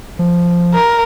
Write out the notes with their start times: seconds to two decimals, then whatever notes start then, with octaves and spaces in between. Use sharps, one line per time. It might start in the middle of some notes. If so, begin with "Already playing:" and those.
0.19 F3
0.74 A#4